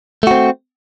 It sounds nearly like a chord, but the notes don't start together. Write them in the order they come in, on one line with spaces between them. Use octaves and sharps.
A3 F#4 C4